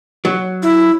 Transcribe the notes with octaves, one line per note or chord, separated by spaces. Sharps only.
F#3
E4